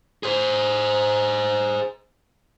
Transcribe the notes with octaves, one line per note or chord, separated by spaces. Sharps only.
G#4 C5